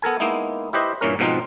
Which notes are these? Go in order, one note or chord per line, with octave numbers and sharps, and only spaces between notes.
B3 A4 A#4 G#5
G#3 A#3 B3 D#4 E4
E4 G4 B4 C5 D#5
G2 A#2 E3 C#4 A#4
G#2 B2 F3 C4 D#4 F4